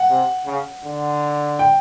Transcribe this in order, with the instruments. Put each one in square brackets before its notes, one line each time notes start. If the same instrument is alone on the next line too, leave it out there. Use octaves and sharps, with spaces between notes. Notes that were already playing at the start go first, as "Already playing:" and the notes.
Already playing: [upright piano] F#5
[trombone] C3
C#3
D3
[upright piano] G5